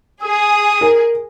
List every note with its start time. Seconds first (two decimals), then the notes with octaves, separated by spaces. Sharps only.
0.24 G#4 D#6
0.81 A#4